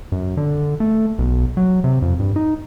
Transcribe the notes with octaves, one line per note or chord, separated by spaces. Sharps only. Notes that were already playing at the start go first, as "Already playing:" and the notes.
F#2
D3
A3
B1
F#3
C3
F2
G2
D#4